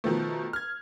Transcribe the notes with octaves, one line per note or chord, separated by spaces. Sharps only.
B2 D#3 F3 A3
F6 G#6